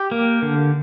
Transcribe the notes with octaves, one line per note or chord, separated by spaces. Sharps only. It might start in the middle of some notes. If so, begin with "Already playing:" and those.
Already playing: G4
A#3
D3